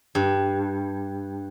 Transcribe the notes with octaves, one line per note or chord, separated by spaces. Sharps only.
G2